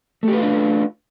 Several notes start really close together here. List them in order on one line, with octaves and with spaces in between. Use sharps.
A3 G4 B4 F4 D4